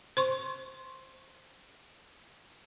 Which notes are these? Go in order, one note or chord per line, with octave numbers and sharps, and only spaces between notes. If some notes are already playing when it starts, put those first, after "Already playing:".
C5 C6 C#6